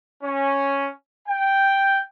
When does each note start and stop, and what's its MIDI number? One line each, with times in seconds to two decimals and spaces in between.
0.23 0.89 61
1.28 2.00 79